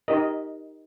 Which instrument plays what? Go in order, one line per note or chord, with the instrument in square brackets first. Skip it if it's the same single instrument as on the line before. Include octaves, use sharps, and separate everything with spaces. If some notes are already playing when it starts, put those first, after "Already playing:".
[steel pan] D#4 G4 A#4 D#5